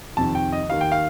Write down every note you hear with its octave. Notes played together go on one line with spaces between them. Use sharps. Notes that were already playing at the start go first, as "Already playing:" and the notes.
F2 C3 D#3 A5
G5
D#5
D#2 D#3 A#3 F5
G5
F5